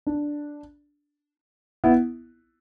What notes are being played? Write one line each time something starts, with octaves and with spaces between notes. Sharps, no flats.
D4
B3 E4